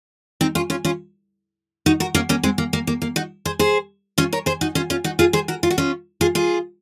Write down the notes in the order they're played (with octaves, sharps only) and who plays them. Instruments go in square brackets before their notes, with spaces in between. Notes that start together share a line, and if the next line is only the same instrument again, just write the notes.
[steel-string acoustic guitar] C4 D#4
C#4 F4
C#4 F4
C#4 F4
D#4 F#4
F#4 A#4
A#3 C#4
A#3 C#4
G#3 C4
A#3
A#3
A#3
A#3
D#4 F#4
G#4 C5
G#4 C5
C#4 F4
A#4 C#5
G#4 C5
D#4 F#4
C#4 F4
C#4 F4
D#4 F#4
F4 G#4
G#4 C5
F#4 A#4
F4
F#4
C#4 F4
F4 G#4
F4 G#4